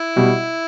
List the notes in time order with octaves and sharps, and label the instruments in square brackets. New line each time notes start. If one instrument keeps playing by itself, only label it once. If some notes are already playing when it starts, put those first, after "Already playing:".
Already playing: [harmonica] E4
[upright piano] B2 G3